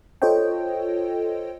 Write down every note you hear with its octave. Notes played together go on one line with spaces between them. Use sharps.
F4 A4 C5 C#5 D#5 G5